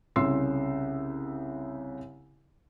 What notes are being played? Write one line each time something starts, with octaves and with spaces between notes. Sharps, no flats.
C2 C#3 C6 E6 C7